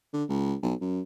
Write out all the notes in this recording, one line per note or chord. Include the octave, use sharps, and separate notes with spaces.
D3
C#2
B1
F#2